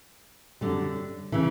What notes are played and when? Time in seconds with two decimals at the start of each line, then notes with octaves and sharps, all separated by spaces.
0.61 F#2 D3 G3
1.32 C#3 E3